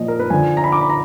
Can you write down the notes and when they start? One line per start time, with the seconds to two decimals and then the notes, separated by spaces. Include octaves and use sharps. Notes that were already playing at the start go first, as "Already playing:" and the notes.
Already playing: A#2 F3 D#5
0.08 A#4
0.19 B4
0.30 D3 F3 G#5
0.57 A#5
0.64 B5
0.72 D6
0.81 B5
0.90 A#5